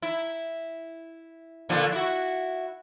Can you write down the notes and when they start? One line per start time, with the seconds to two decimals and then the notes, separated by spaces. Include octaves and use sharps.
0.02 E4
1.69 A#2 D3 F3
1.92 E4 F#4